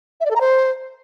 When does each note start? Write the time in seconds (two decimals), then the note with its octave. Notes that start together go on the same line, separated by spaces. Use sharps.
0.20 E5
0.25 D5
0.31 A4
0.36 A#5
0.41 C5